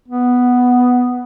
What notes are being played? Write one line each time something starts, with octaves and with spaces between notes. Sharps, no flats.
B3